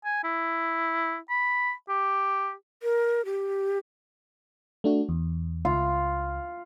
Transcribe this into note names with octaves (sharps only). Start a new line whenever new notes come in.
G#5
E4
B5
G4
A#4
G4
A3 D4 F#4
E2
C#2 F4